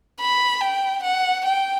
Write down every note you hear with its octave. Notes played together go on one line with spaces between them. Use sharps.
B5
G5
F#5
G5